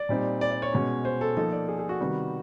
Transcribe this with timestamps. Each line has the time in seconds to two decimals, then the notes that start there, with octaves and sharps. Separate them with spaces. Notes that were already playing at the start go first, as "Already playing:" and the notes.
Already playing: D5
0.09 A#2 G3 C4 D#4
0.41 D5
0.51 D5
0.62 C#5
0.73 B2 G#3 C#4
1.05 C5
1.21 A4
1.37 F3 A#3 D#4 A4
1.52 D5
1.69 G#4
1.79 G#4
1.89 F#4
2.01 C3 D#3 G3 B3